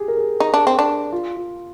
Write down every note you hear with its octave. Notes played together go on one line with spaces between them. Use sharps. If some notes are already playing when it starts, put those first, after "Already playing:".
Already playing: G4 G#4
A#4
G#4
D#4
D4
C4
D4
F4
F4